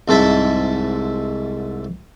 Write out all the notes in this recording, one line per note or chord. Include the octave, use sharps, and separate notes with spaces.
C2 G#2 A4 E5